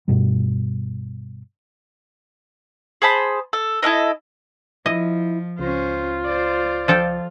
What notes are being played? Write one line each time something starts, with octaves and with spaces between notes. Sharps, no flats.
G2 B2 G3
G#4 C5 A5 B5
A4
E4 A4 A#4 D#5
F3 E4 D#5
C#2 C#4 F4 C5
C5 D5
F3 A4 G5